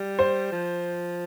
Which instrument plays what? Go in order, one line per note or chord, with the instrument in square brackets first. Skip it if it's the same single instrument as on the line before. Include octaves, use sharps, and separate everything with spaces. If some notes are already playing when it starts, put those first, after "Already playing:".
Already playing: [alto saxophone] G3
[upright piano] C5
[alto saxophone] F3